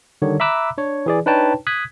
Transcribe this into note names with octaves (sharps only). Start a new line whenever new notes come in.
D3 D#3 G3 C#5
E5 A#5 B5 D6 E6 F#6
D4 C#5
E3 G#4 D5
D4 D#4 B4 C#5 G5 A5
D#6 F#6 G#6 B6